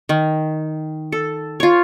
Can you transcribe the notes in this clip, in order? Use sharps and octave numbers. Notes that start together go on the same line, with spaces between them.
D#3
A4
F4 C#5